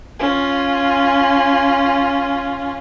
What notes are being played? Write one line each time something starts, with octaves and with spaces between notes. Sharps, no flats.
C#4 F4